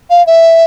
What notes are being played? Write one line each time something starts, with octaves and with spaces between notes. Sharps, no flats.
F5
E5